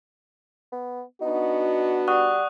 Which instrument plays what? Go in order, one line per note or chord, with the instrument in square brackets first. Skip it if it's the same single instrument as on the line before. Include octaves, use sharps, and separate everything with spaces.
[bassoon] B3
[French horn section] B3 D4 F#4 [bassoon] D#4
[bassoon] G3 [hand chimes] D5 F#5 [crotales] C#6 D#6 F#6